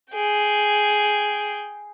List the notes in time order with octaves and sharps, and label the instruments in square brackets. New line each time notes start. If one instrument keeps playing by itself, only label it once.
[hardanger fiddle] G#4 G5